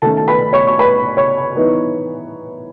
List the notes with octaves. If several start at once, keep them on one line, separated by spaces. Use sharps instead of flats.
D#3 A3 C#4 A4 A5
A5
B4 B5
C#5 C#6
C#6
B4 B5
C#5 C#6
E3 B3 D#4